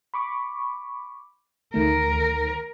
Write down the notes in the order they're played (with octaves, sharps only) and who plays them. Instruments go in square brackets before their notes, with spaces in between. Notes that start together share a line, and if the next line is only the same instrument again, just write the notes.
[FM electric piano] B5 C#6 D6
[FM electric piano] D2 D#3 A3 [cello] A#4